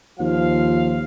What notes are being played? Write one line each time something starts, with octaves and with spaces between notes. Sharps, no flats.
D#2 F3 F5